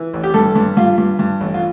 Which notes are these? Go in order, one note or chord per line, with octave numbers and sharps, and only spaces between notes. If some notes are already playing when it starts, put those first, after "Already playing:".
Already playing: E3
A1
G4
G2 A4
G2
G2 F4
G2
G2
A1
F4